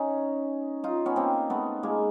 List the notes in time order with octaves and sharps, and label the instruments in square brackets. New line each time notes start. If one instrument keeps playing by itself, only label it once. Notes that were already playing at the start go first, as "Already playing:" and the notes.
Already playing: [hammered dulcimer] C#4 D#4
D#4 F4
B3 C#4
A#3 C4
A3 B3
G#3 A#3